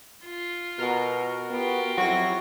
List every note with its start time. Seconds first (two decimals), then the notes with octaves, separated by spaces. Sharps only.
0.25 F4
0.79 B2 F#4 A#4
1.50 B3 F4 G4
1.98 F2 F#3 E4 F#4 A#6